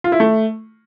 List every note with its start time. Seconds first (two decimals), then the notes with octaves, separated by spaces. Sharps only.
0.04 F4
0.12 E4
0.20 A3